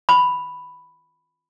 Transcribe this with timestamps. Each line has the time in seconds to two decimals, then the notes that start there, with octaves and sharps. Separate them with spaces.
0.09 B5